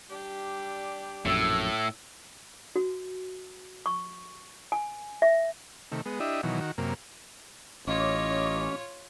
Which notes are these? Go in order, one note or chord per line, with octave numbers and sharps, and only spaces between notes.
G3 D4 G4
A#1 F#2 A2 E6
F#4
C#6
G#5
E5
C3 D#3 A3
G#3 B3
D4 E4 G4 D#5 E5
B2 D#3 E3 F#3
D#3 F#4
F#2 C3 A#3
A1 C#4 F4 C#5 D#5 D6